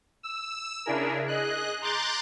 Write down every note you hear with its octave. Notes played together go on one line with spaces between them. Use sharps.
E6
C#3 D4 E4 G#4 A#4
G#4 D#5 F#6
A#5 C6 D6 F#6 G6 A6